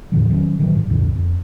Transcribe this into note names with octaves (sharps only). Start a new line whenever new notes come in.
E2 A2 D3 F3
D#3 F#3 C4 C#4
A1 D#3 F#3
G#2
C2 F2 A#2 D3
F2